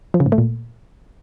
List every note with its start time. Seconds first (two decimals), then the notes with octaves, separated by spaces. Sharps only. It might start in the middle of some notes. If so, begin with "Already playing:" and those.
0.14 F3
0.20 C#3
0.26 G#2
0.32 A3
0.38 A#2